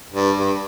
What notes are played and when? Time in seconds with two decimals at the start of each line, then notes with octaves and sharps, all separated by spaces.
0.13 G2
0.38 G2